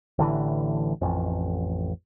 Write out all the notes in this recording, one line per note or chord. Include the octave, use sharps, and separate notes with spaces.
A1 D3 E3
A1 F2